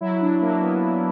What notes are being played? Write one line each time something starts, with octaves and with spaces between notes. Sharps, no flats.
F#3 E4
F#3 D4
F#3 A#3
B3